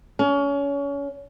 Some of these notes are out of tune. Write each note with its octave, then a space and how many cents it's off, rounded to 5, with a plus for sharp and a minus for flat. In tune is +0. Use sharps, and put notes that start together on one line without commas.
C#4 +30